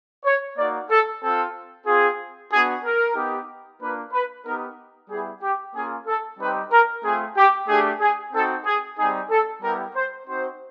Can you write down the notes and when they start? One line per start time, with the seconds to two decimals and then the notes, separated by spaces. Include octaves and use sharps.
0.25 C#5
0.57 A#3 D#4 F#4 D5
0.90 A4
1.22 C4 F4 A4
1.86 C4 F4 G#4
2.51 B3 D4 F#4 G#4
2.84 A#4
3.15 B3 D#4 G4
3.80 A#3 D4 F4 B4
4.12 B4
4.45 B3 D#4 G4 A#4
5.09 G3 B3 E4 G#4
5.42 G4
5.75 A#3 C#4 F4 G#4
6.07 A4
6.39 G3 C4 D#4 G4 B4
6.71 A#4
7.03 A3 C4 F4 G#4
7.36 G4
7.67 A3 D4 G4 G#4
8.00 G#4
8.33 C4 D#4 F#4 A4
8.65 G#4
8.97 G3 C4 D#4 G#4
9.30 A4
9.61 G3 B3 E4 G4 A#4
9.94 C5
10.26 C4 D#4 F#4 C5